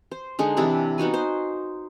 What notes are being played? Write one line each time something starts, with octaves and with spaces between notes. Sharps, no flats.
C5
D3 G#3 D#4 C6
C3 E3 D4 E4
B3 D#4 F#4 G#5
C5